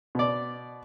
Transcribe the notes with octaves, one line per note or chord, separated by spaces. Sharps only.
B2 D5